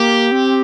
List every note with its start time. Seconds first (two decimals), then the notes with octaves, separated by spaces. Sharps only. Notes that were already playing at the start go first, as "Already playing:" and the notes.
Already playing: A#3 G4
0.32 C4